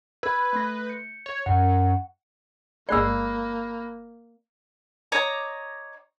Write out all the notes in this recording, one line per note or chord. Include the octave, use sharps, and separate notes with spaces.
B4 B5 E6 G#6
A3 C6 A#6
G6 C#7
C#5
F#2 F#5
G1 G#3 A#3 D5 B5 E6 F#6 C7
C#5 D#5 A#5 D6